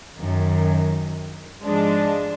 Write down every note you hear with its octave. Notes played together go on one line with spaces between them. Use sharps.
F#2 D#3
G#2 F3 G#3 D4